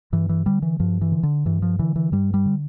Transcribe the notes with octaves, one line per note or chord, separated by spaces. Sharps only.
G2 E3
E3
D3 G3
E3
G2 F3
E3
D3
D3
G2 E3
F3
D3 E3
E3
G2 G3
G3
D3